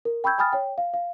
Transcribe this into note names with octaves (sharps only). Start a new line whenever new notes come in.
A#4
G5 B5 C#6 E6 G6 G#6
G5 G#5 B5 D#6 F6 A6
C#5 G5
F5
F5